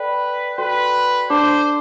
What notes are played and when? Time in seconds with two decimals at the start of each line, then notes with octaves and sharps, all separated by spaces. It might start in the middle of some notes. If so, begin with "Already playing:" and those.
Already playing: A4 B4 D5 G5 B5
0.58 F#4 A4 B4 D5 G5 C6
1.30 D4 A4 C5 D5 A5 D6